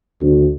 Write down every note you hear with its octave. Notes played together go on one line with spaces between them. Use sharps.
D2